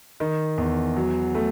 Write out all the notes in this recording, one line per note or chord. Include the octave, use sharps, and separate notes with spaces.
D#3
E2
F#3
A3